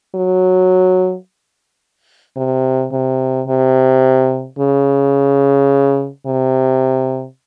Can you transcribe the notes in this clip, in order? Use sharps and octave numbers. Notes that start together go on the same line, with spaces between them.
F#3
C3
C3
C3
C#3
C3